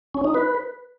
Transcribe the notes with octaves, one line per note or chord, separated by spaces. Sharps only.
C#4
D#4
B4